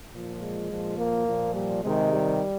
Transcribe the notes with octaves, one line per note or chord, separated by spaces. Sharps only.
A#2 F3
G#3
A#2 F3
A#3
A#2 F3
G3
C3 D#3 G#3
G3